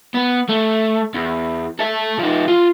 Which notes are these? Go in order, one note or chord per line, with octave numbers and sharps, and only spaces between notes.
B3
A3
E2
A4 E5
F3 D#4
F4